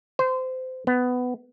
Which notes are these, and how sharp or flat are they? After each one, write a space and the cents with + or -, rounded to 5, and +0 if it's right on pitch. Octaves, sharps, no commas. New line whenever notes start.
C5 -25
B3 +15